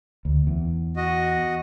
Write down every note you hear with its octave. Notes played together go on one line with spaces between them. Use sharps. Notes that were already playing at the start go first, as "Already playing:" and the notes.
D2
E2
F#4 D#5